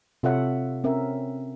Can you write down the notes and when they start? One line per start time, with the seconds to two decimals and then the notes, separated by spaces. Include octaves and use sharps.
0.23 C3 F4 A4 C#5 E5 F#5
0.84 C4 C#4 A#4 E5